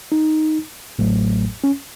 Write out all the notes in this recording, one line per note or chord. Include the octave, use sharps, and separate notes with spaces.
D#4
A1 A2 F#3 A3
C#4